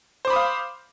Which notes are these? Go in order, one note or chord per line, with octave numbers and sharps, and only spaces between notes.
C5 F5 B5 D6 D#6